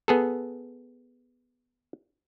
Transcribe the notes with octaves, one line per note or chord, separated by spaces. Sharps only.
B3 G#4 A4